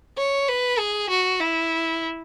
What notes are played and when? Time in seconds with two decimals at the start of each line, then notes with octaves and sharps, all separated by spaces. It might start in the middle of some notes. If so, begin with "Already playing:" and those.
0.17 C#5
0.48 B4
0.79 G#4
1.10 F#4
1.40 E4